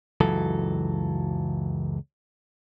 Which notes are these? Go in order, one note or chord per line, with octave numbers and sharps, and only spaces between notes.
C#2 F#2 E3 F#3 A4